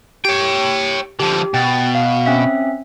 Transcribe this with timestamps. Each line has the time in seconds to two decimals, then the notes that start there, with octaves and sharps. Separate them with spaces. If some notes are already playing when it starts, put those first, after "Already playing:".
0.25 G4 C#5 G5
1.20 D3 F3 G4
1.54 B2 G5 A6
1.95 F5
2.26 C4 C#4 E5